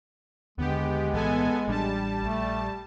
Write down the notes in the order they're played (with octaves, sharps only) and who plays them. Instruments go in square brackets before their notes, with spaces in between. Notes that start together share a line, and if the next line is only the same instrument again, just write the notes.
[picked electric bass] D#2 D3 [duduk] G#3 [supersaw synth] B3 G4
[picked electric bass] B1 A2 E3 [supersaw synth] B3 A4 G#5
[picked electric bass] A1 D4 [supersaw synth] G3 A5
[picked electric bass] A#1 [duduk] A3